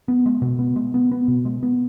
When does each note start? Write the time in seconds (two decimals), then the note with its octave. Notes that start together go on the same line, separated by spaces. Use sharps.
0.08 B3
0.26 G#3
0.42 B2
0.59 B3
0.76 G#3
0.94 B3
1.12 B3
1.28 B2
1.45 G#3
1.63 B3